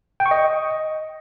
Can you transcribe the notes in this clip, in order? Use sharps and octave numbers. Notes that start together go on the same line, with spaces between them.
G5
C#6
D#5